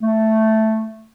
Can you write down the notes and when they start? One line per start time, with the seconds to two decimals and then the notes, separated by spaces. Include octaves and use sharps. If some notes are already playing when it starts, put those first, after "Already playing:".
0.01 A3